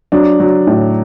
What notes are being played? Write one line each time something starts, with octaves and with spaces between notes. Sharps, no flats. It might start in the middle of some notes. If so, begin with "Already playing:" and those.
F#3 D4
F#3
A2